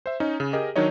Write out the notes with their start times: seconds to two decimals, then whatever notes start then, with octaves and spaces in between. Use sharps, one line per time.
0.06 C5 E5
0.20 C#4 D#4
0.40 C#3
0.53 G4 G#4 A#4 D#5
0.76 D#3 F#3 D4 D#4 C#5 D#5